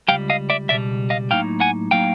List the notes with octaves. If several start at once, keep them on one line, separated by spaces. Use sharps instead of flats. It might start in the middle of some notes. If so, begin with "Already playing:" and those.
C#2 B2 G3 F5 G5
D#5 F5
D5 E5
C#2 B2 G3 D5 E5
D#5 F5
A2 F#3 A#3 D#4 F5 G5
F#5 G#5
A2 F#3 A#3 D#4 F5 G5